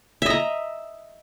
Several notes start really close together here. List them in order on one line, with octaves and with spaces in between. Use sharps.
E5 D#5 A#5